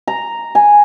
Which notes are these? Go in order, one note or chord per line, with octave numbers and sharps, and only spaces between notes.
A#5
G#5